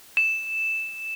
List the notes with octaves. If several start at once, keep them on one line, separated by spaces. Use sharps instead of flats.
E7